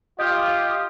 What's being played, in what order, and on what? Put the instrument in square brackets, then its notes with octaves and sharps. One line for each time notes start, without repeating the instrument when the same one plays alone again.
[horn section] F4 G4 [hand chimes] D#5 G6 [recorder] D#6